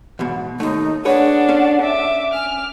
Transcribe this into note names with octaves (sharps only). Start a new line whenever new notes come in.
E2 G#2 B2
D#2 A3 D#4
D4 G#4 B4 C#5 F#5
C#4 A4
E5 D6
G#5 F6